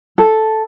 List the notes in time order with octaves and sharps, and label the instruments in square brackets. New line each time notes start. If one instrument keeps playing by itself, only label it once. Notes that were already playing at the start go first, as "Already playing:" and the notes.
[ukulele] A4